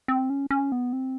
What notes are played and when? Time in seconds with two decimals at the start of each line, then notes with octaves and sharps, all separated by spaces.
0.08 C4
0.30 C#4
0.51 C#4
0.72 B3
0.93 C4